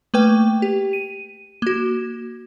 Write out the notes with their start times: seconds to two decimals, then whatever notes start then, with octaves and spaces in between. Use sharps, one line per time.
0.14 A3 A#3 B4 G5
0.62 G4
0.93 D#7
1.62 A#3 F#4